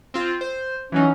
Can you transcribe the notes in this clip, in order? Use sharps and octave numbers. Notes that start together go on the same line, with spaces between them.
C4 F4
C5
E3 F#3 C#4 D#4